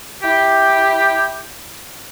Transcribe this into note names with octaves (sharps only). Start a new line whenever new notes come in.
E4 G4